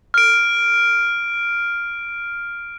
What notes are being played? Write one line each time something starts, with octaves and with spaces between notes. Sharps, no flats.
F6 D7